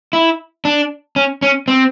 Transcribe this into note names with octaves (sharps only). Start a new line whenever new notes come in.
E4
D4
C#4
C#4
C4